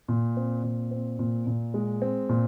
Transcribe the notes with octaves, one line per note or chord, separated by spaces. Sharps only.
A#2
C4
A#2
C4
A#2
A#2
G#3
C4
A#2